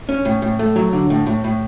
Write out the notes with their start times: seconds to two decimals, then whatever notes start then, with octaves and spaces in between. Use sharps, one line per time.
0.09 C#4
0.25 A2
0.42 A2
0.59 A3
0.76 F#3
0.93 D3
1.10 A2
1.26 A2
1.44 A2